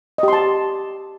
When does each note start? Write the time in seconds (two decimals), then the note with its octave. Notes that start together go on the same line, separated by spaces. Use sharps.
0.18 D#5
0.23 G4
0.28 C6
0.33 A5